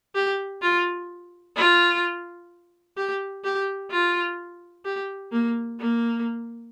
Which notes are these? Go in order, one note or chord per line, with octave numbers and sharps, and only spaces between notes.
G4
F4
F4
G4
G4
F4
G4
A#3
A#3